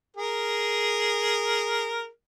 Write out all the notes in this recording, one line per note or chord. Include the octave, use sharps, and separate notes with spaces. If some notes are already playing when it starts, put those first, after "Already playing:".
G#4 A#4